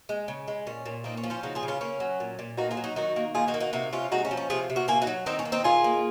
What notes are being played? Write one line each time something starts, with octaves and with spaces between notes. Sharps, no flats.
G#3
C#3
G#3
A#2 C#4
A#2
A#3 C4 D#4
C#4
F3
C#4 F4
C#3 D#4 F#4
F4 G#4
C#3
C#4 F4
A#3 C#4
F#3
A#2
A#2
A#3 D#4 F#4
F4 G#4
F#3
D#4 F#4
D#3 D#4 F#4
A#3
D#3 F4 G#4
D#4 F#4
A#3
D#4 F#4
C3 D#4 F#4
C3 C#4 F4
G#3 D#4 F#4
C#4
F3
C#4
C3 F4 G#4
C3
F#4 A#4
A#3 F4 G#4
D#4 F#4
F#3
D#3 C4 D#4
C#4
A#3
C4 D#4
D#3 F4 G#4
A#3